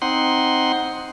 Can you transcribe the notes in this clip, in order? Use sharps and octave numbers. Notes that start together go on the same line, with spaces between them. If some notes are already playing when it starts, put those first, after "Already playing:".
C4 D#4 F#5 C6